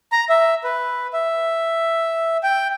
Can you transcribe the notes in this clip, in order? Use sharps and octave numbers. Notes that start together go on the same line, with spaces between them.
A#5
E5
B4
E5
G5